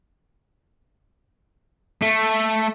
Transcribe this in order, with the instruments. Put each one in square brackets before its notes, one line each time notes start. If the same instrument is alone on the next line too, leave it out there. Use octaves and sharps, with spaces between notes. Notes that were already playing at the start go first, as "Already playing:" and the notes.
[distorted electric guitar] A3